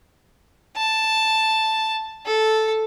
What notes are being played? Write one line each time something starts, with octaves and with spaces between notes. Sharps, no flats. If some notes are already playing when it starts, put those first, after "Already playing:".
A5
A4